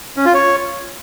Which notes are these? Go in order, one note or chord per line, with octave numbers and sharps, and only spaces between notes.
C#4
F4
C#5